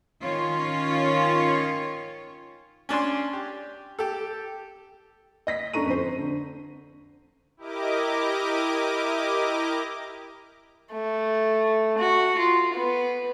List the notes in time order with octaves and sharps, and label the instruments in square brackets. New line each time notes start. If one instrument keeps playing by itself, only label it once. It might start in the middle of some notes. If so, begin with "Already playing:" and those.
[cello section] D#3 C#4 F4 C#5
[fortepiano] C#4 D4 G#5 C6
G4
G4 A4
[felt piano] D#5 A#6 B6
F#2 D4 A4 A#5 C#6 D#7
F2 C5
D3
[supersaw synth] E4 G4 A#4 D#5 D6
[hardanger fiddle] A3
F#4
F4
B3